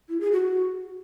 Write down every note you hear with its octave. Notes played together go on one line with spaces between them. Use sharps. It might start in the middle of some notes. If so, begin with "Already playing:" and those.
E4
G#4
F#4